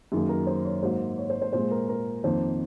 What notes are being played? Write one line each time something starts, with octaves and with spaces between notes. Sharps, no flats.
F#2 D#3 A#3 G#4
A#4
C5
C#5
G#2 F#3 A#3 C5
C#5
C5
C5
A#2 G#3 C5
A#4
A#4
F2 D#3 A#3 C5